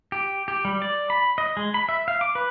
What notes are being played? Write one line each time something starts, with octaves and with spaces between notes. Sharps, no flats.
G4
G4
G3
D5
B5
D#5
G#3
B5
E5
F5
D6
B4